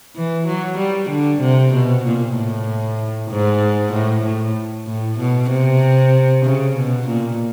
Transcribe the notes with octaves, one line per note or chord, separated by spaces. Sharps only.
E3
F#3
G3
D3
C3
B2
A#2
A2
G#2
A2
A2
A2
B2
C3
C#3
B2
A#2